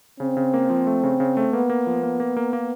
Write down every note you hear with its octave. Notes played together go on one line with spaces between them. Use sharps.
C#3 C4
C#3
A#3
F3
A3
C#3
C#3
A3
A#3 B3
A#3
F3
A#3
A#3
A#3
A#3